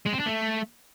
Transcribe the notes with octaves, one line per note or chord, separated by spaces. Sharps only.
G#3
C4
D4
A3